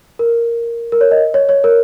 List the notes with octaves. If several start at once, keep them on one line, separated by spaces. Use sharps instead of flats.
A#4
A#4
C#5
D#5
C#5
C#5
A#4